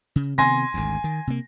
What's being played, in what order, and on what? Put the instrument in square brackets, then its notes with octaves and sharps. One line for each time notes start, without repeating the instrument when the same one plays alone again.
[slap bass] C#3
[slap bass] C3 D#3 B3 [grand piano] G#5 C6 A#6
[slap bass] G#1 D2
D#3
C3 A#3